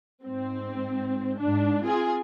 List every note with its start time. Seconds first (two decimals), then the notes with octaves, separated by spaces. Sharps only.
0.24 G#2 C4
1.39 G#2 D4
1.84 C4 F4 G#4 G#5